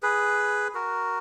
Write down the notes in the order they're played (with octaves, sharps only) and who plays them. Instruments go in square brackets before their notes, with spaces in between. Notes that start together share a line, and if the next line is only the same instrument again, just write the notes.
[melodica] G#4 B4
F#4 A#4